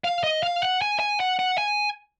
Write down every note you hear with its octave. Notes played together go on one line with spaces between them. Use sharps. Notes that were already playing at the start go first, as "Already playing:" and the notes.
F5
D#5
F5
F#5
G#5
G#5
F#5
F#5
G#5